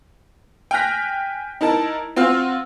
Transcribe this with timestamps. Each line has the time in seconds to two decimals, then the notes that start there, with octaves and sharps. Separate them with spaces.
0.71 G5 G#5 F6 F#6 A#6 B6
1.61 D#4 E4 A#4 A5
2.16 C4 F4 F#4 C6 F6